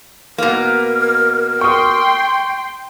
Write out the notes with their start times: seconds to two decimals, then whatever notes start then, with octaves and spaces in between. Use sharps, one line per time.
0.38 B2 A#3 A#4
1.61 G5 C6 C#6 D#6